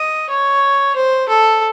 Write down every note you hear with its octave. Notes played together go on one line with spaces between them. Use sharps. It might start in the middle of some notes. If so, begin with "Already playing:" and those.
Already playing: D#5
C#5
C5
A4